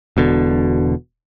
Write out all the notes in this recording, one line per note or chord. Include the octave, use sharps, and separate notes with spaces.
E1 B2 D3